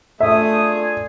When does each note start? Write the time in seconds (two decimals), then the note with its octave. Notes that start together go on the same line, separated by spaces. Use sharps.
0.20 A3 D4 F4 G#4 E5 D#6